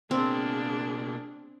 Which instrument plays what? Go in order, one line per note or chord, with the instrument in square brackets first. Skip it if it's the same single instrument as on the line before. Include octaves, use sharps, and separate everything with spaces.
[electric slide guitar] B2 A#3 [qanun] C4 [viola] D4 G#4